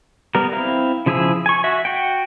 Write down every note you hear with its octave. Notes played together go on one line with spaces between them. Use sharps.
G3 B3 A#4
C4 E4 F5
C#3 F3 E4 G#4 E6
G#5 C#6
F#4 E5
F#4 F#5 G5